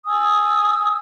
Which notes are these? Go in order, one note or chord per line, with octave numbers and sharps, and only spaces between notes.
G#5 D#6 E6